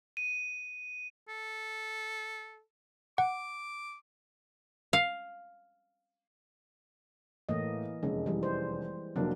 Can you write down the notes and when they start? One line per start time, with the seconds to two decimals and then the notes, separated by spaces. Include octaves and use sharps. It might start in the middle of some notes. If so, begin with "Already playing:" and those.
0.17 D#7
1.29 A4
3.18 F#5 D6
4.93 F5
7.49 A2 E3 A#3 D#5
8.03 F1 F#2 G#3
8.26 E3 G3
8.43 C5
9.16 F1 F#3 A#3 D4